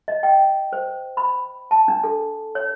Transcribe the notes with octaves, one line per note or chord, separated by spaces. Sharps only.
D#5
G5
C5
B5
A5
D4
A4
C#5